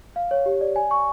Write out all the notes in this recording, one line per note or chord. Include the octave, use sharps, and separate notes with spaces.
F5
C#5
G4
D5
G#5
C#6